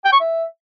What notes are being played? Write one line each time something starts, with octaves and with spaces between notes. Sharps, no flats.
G5
C#6
E5